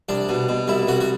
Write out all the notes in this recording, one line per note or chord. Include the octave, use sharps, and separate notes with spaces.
C2 D4
B2
B2
C2 E4
C2 F#4
F#4